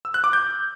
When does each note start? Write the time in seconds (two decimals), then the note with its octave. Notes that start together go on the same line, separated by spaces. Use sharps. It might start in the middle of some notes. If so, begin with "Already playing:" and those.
0.05 E6
0.14 F#6
0.24 D6
0.33 G6